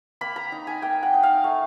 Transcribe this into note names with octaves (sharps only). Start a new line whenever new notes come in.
A#3 B5
A#5
D#4
G#5
A#3 G5
F#5
D#4
F5
A3